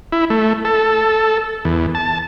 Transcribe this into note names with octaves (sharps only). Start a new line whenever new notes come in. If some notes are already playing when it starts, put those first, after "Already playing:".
E4
A3
A4
E2
A5